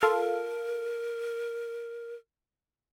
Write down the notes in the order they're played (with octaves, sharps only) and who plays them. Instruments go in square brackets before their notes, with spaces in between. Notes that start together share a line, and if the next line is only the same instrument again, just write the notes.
[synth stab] F4 A4 F5 [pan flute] A#4